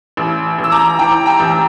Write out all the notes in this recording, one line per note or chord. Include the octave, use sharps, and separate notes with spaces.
A1
A1
E6
A#5 D6
E3 G5 A#5
G5 A#5
A1